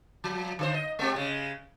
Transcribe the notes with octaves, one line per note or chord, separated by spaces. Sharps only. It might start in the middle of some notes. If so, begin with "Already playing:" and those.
F3
D3 G#4 C5
D#5
G#3 C4 G4
C#3 G#3